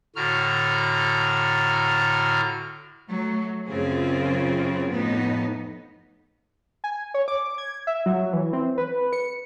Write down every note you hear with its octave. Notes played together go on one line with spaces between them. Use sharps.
A2 D3 F#4 A#5 F6
F#3 A3
F#2 C#3 C4 F4 G#4
F2 A2 B3 D#4
G#5
C#5
D6
G#6
E5
F#3
E3
C4
B4
C#7